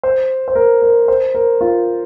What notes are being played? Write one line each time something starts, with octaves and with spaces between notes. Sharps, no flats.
C5
C5
A#4
A#4
C5
A#4
F4